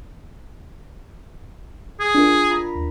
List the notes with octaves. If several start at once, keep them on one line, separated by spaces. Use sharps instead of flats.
G#4
D4 F4 A#4
F4 A#5 B5
D#2